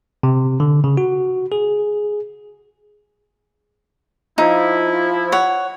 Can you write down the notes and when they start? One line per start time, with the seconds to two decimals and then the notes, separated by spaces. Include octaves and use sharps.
0.23 C3
0.60 D3
0.84 C#3
0.97 F#4
1.52 G#4
4.38 F3 D#4 E4
5.32 C#5 F#5